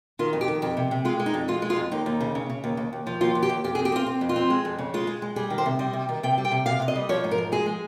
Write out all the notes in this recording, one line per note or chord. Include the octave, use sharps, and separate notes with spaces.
D#3 F4
F2
G4
D#3
F2 G4
C3
C3
G#3 F4
G#3
D#4
F2
G#3 F4
G#3
F4
F2
D#2 D#4
D#2
C#3
C#3
C#3
D#2
D#2
D#2
F3
D#2 F4
D#2
G4
D#2
F2 G4
G#4
C4
G4
C4 F4
C4
F2
F4
C4
G#3
F2
C#3
G#3 F4
G#3
G#3
G3 G#4
D#3
C5
C3
G3 D#5
C3
D#3
C3 G5
G3
G5
C3
C3 F5
C3 F5
D#5
G3
F3 C#5
G#2
A#4
F3
G#3 G#4
G#3